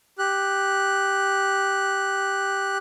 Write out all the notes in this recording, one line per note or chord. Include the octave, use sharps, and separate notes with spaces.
G4 F#6